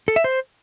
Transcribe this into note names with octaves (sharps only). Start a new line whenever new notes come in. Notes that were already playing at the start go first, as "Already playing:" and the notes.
A4
E5
C5